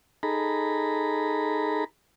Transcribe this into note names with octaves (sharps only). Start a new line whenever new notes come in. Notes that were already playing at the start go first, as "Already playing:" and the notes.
D#4 G#4 A4 A#5 B5